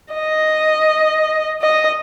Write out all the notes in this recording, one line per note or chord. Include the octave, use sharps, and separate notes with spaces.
D#5
D#5